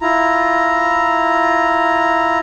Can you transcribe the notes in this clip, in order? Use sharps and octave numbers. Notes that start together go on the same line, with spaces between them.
E4 F4 A#5